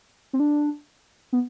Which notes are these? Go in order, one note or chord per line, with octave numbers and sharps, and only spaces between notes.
C4
D4
B3